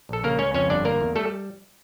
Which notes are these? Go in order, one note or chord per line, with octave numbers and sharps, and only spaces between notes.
A#1 A4
C#3 A#3 A#4
C#2 C#4 C#5
F2 C#4 C#5
G1 D4 D5
D3 A#3 A#4
E2
G3 A3 A4